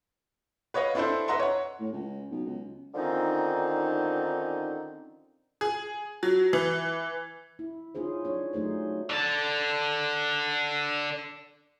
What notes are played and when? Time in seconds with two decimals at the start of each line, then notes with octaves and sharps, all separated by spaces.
0.74 B4 C#5 D#5 F5 F#5
0.95 C4 D4 E4 A4 C5
1.28 B4 D#5 E5 F#5 A#5 C6
1.39 C#5 F#5
1.80 A2
1.93 C#2
2.31 B1
2.46 C#2
2.94 D3 D#3 F3 C4 C#4 D#4
5.61 G#4
6.23 F#3
6.53 E3
7.59 E4
7.95 C#4 D#4 F4 G#4 C5
8.25 F#3 D4 C#5
8.53 F#3 A3 D#4 G#4 C5
9.10 D3 A5